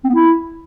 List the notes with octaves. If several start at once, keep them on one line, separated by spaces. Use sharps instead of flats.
C4
B3
E4